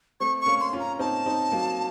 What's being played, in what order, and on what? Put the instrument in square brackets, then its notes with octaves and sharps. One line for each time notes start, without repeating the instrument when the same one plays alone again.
[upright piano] A3 C4 [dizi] C#6
[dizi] C#6
[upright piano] A#3 C#4
[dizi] C6
[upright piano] C#4 F4
[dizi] A#5
[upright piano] C4 D#4 [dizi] A5
[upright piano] C4 D#4
F#3 A#3